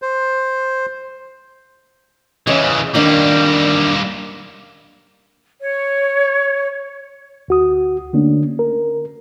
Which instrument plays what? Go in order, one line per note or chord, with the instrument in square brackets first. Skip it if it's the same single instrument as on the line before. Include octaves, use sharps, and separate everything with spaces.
[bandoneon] C5
[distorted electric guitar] C#3 E3 [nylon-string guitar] C#4 C#5 D#5
[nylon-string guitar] D#3 D4 [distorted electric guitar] G3 A#3
[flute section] C#5
[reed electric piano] D2 F#4 D#6
D3 A3 A#3 C#4 D4
A#4